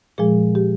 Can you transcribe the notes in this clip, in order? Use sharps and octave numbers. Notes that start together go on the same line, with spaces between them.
A#2 F3 G#3 G#4
G4